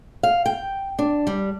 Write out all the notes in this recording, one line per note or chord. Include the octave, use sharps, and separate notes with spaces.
F5
G5
D4
G3